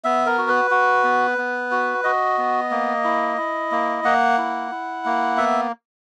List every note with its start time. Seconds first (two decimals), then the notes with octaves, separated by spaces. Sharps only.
0.04 B3 E5
0.26 A#4
0.38 F#4
0.48 B4
0.71 F#4
1.04 B3
1.38 B3
1.71 F#4
2.04 F#4 D#5
2.38 B3
2.71 A#3
3.04 E4
3.37 E4
3.72 A#3
4.04 A#3 F#5
4.38 E4
4.72 E4
5.05 A#3
5.37 B3 E5